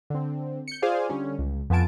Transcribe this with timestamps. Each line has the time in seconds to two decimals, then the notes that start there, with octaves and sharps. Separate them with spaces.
0.10 D3 C4
0.68 G6 C#7
0.82 F4 G#4 C5 D5 F5 G#5
1.10 D3 G3 C#4
1.38 C#2
1.70 F2 B3 F4 G#5 A5 D7